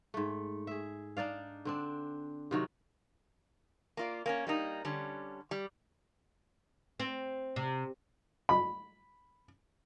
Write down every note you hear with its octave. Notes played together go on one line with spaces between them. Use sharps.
G#2 A3
G#4 E5
D4 D#4 D5 F5
D3 C4 D4
C3 D#3 F#3 F#4
A#3 F4 D5
A#3 C4 C#4
G3 A#3 D#4
D3 G3 C#4
G3
C4
C3
B5